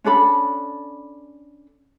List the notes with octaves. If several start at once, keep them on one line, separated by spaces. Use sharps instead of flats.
C#4 D4 A4 B5